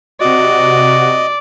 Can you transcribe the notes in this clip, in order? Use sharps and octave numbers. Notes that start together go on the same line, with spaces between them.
C3 F#4 D5 D#5